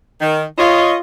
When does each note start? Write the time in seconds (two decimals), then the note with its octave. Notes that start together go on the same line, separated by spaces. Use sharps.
0.20 D#3
0.58 F4 C#5 D#5